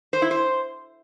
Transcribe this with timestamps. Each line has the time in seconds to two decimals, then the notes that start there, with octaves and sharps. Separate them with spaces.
0.13 C5
0.22 E4
0.31 C5